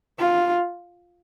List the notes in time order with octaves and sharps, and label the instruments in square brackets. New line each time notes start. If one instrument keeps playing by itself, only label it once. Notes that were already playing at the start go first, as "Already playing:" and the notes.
[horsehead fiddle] F4